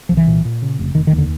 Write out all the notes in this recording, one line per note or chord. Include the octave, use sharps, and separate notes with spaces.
C2 F3
E3
A#2
A#2
C#3
F1
F1 D#3
D#3
D#2
D3